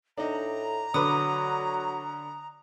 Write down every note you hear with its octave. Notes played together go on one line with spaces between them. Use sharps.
A2 D4 D#4 A#5
D3 F#3 B4 D6 D#6